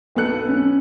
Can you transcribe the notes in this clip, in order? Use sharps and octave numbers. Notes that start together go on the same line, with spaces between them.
B1 B3 A4 F#6 C#7
C#4